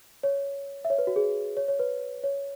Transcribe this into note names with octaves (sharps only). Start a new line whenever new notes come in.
C#5
E5
C#5
B4
F#4
G#4
C#5
C#5
B4
C#5